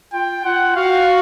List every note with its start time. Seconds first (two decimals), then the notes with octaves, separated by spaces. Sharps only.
0.13 F4 G5
0.45 F4 F#5
0.76 F#4 F5